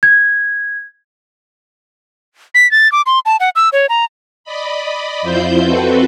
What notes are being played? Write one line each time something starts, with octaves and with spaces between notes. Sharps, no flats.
G#6
B6
A6
D6
C6
A5
F#5
E6
C#5
A#5
D5 D#5 B5
F2 E4 F4 C5 G6
C4 F#4 A4 B4